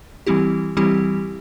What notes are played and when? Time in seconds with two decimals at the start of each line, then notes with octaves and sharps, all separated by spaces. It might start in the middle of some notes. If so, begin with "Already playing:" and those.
0.27 E3 G3 C4 E4 G4
0.77 E3 G3 C4 E4 G4